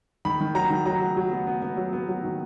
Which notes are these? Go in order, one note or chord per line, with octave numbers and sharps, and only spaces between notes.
D#3 B5
D#3
F#3 A#5
D#3
F#3 A#5
F#3
F#3
B3
B3
B3
F#3
B3
F#3
D#3